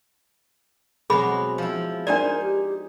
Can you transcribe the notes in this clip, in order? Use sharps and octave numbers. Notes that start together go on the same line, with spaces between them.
B2 F#3 G#3 C4 G#4 B5
F3 E4
D4 D#4 A#4 C5 D5 G#5
G4